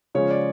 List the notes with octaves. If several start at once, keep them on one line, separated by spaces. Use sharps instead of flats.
C#3 F3 G#3 C#4 F4 C#5
D5